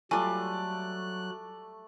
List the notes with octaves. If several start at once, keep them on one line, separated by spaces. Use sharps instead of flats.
F#3 G3 A3 F4 D5 G#5 F#6